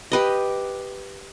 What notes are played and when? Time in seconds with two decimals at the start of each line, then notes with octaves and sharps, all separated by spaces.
0.12 G4 B4 D#5